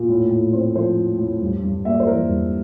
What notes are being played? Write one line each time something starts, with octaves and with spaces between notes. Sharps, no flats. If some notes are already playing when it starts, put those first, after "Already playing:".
Already playing: A#2
A2
A2
C4
F3 C5
A2
A2
G2
G2
A#3 E5
D5
C5
E3 A#4
G2